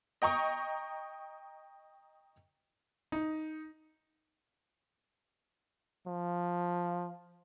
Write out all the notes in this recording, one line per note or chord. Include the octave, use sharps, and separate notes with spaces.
D#5 G5 A#5 C#6 D#6
D#4
F3